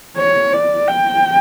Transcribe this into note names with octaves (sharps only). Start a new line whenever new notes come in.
C#5
D5
G5